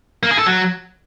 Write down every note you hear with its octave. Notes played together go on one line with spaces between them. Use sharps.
A#3
G#4
A4
F#3